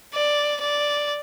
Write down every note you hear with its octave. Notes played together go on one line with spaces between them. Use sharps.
D5
D5